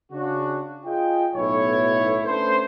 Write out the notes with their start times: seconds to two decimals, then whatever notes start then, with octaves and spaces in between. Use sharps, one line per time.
0.12 C#3 D4 F#4
0.85 F4 G#4 D#5 G5
1.35 B1 A2 E4 C#5
2.25 A3 C#4 D4 B4 C5